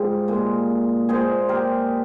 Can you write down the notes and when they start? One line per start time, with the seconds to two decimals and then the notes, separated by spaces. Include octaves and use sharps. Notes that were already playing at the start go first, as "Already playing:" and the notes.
Already playing: G#2 G3 F4 G#4
0.28 A#2 G#3
1.09 A#2 G#3 G#4 C5
1.49 G4 A#4